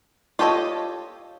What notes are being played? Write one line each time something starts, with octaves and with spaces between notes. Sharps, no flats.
F4 G4 A4 C#5 D#5